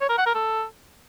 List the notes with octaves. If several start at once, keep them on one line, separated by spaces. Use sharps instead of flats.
C#5
A#4
F#5
A#4
A4